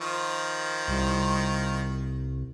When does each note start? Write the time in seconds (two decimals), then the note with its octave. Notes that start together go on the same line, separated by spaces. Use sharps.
0.01 D#3 F3
0.88 C2